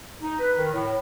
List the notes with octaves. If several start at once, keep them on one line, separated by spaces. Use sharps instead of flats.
D#4
B4
D#3
A2